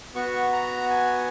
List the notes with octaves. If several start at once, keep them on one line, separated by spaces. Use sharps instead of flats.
B3 F#4 C#6
A#5
G#5